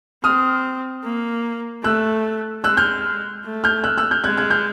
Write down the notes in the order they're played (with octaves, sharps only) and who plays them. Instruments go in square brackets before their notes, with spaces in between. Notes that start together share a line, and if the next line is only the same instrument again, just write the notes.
[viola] C4 [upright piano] D#6 F6
[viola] A#3
[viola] A3 [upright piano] E6 F#6
[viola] G#3 [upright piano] E6 F#6
[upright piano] F6 G6
[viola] A3
[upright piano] F6 G6
E6 F#6
E6 F#6
F6 G6
[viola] G#3 [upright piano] F#6 G#6
[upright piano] F#6 G#6
F6 G6